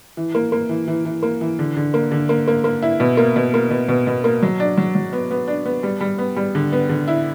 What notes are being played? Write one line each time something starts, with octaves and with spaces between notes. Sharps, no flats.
E3
A#3
A#3
E3
E3
E3
A#3
E3
D3
D3
A#3
D3
A#3
A#3
A#3
E4
B2
A#3
B2
A#3
B2
B2
B2
A#3
F#3
D4
F#3
F#3
B3
B3
D4
B3
G3
G3
B3
G3
D3
B3
D3
E4